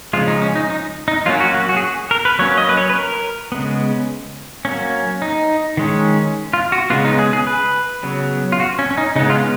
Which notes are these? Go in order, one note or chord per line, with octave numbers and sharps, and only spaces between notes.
C#3 F3 G#3 F4
D#4
C#4
D#4
D#4
D#4
F#3 A#3 C#4 F4
F#4
F#4
F#4
G#4
F#4
A#4
B4
F#3 A#3 C#4 C#5
D#5
B4
C#5
B4
A#4
C#3 G#3 B3
F#3 A#3 C#4
D#4
D#3 G#3 C#4
F4
F#4
C#3 G#3 B3 F4
D#4
G#4
G#4
B4
C#3 F#3 B3
F4
F#4
C#4
C#4
D#4
C#3 G#3 B3 D#4
F4